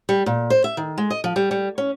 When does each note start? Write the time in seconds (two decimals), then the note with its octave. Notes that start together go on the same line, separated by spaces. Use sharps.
0.09 G3
0.26 A#2
0.50 C5
0.64 E5
0.77 D#3
0.98 G#3
1.10 D#5
1.24 F3
1.36 G3
1.51 G3
1.78 C#4